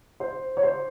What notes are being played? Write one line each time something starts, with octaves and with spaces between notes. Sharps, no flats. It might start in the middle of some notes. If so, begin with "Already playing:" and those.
C5
C#5
C5